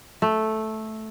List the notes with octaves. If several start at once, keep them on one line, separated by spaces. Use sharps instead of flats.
A3